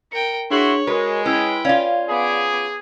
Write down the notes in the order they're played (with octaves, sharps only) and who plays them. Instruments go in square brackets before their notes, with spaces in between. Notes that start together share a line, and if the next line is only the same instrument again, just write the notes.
[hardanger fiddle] A#4 G5 [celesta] C#7
[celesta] D4 G#4 F#7 [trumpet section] E4 F#4 C6 [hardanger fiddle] C#5
[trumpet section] G#3 [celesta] F#4 A#4 [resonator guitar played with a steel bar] B4
[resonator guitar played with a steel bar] C#4 [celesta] E4 E6 [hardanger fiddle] B4 G5
[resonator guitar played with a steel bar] C#4 F4 [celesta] C#5 D5 F5
[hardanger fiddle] B3 D6 [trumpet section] G#4